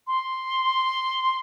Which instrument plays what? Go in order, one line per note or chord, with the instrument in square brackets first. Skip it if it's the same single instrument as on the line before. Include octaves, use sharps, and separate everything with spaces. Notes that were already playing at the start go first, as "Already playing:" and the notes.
[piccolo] C6